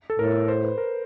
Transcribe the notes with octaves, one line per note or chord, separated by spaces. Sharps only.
A4
A2 A#4
C5
B4
A#4